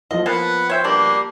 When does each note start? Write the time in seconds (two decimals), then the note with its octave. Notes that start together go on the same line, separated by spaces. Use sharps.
0.11 F3 F4 D#5
0.26 A#3 B3 F5 F#5 A5
0.69 C5 C#5 E5 G5
0.84 B2 G3 A#3 D4